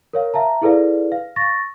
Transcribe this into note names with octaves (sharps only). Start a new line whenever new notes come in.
A#4 C#5 F5
E5 F5 A5 A#5
E4 G#4 A4 B4 D5 F5
F5
C#6 A6 A#6